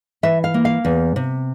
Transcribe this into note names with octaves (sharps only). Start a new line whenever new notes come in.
E3 E5
F5
A#3
F5
E2
C3